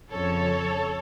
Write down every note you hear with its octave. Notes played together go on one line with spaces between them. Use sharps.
F2 C#3 F3 A4 C#5